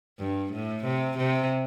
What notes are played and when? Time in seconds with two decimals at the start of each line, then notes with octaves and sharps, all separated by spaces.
0.19 G2
0.52 A2
0.84 C3
1.17 C3